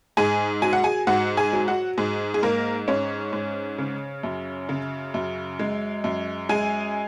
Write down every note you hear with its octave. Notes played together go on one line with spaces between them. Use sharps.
G#2 G#4 G#5
F#3 G#5
F#5
G#4 G#5
G#2 F#4 F#5
G#4 G#5
F#3
F#4 F#5
G#2 G#4
G#4
G#2 A#3 A#4
G#2 C#4 C#5
G#2
C#3
F#2
C#3
F#2
G#3
F#2
G#3 G#4 G#5